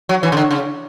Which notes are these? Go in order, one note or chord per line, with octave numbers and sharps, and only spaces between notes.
F#3
E3
C#3
D3
C#3